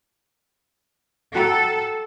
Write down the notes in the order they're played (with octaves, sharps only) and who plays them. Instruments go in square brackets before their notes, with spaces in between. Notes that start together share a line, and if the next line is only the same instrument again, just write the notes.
[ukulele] F#4 G5 A#5 [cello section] A4